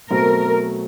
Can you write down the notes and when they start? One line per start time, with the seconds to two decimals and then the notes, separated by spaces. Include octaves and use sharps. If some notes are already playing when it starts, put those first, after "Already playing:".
0.10 B2 F#3 A3 C4 A#4